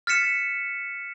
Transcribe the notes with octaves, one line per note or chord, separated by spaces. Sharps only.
F6 A6 B6 C#7 E7